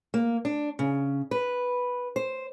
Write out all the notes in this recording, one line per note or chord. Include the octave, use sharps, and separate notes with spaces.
A#3
D4
C#3
B4
C5